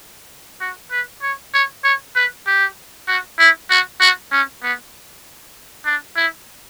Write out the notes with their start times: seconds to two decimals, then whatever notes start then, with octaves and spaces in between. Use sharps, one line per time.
0.61 F#4
0.91 B4
1.22 C#5
1.54 C#5
1.84 C#5
2.16 B4
2.47 G4
3.08 F#4
3.39 E4
3.70 F#4
4.01 F#4
4.32 C#4
4.63 B3
5.86 D4
6.16 E4